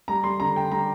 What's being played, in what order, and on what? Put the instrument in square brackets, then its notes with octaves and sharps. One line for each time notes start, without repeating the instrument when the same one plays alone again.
[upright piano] G3 A#5
G3 C6
D3 A#5
D3 G5
G3 A#5